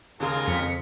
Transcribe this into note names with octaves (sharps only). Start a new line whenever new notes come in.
D#2 C#3 G#3 F4 A#4
F2 B6 C#7